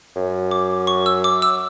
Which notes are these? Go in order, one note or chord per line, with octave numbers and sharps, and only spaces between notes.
F#2
D6
C#6
E6
D6
E6